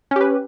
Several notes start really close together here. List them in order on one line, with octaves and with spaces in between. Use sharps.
C#4 G4 B4